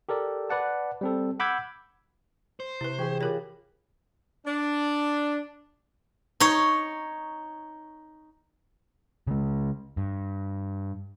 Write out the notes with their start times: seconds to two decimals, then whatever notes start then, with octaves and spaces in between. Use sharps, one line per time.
0.09 G4 A4 A#4 D5
0.50 B4 D5 F#5 A5
1.01 G3 C4 A4
1.40 F#5 B5 D6 E6 G6 G#6
2.60 C5
2.81 C3 E4 B4
2.99 E3 G4 G#4
3.21 F4 G4 A#4 C#5 B5 A#6
4.46 D4
6.40 D#4 C#5
9.27 C#3 G#3
9.97 G2